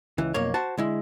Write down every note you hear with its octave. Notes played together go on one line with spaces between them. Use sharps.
C#2 E3
B1 F2 A#3 C#5
F#4 C5 A5
D3 G#3 E4